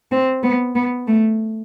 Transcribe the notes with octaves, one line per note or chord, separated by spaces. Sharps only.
C4
B3
B3
A3